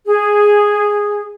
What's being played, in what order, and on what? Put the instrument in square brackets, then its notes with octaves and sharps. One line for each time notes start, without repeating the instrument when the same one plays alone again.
[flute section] G#4